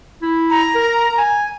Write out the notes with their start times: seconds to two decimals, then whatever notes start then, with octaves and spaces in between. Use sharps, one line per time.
0.22 E4
0.50 A#5
0.75 A#4
1.18 G#5